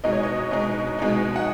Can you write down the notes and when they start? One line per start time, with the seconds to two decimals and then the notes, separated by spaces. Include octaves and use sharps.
0.04 B2 G#3 D#4 D#5
0.12 C#5
0.23 D#5
0.51 B2 G#3 D#4
0.99 B2 G#3 D#4
1.36 F#5